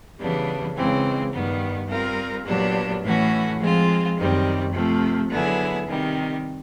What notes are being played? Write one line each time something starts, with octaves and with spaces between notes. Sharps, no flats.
C#3 E3 G3 B3 D4
C#3 E3 G#3 C4
G2 D#3 G3 B3
G3 C4 F4 A#4
A#2 F#3 B3 D4 G4
A2 E3 A3 C#4 F#4
F3 G#3 C4 F4
F#2 D#3 G3 C4
C3 F3 A3
D3 F#3 B3 E4 G#4
C3 D#3 G3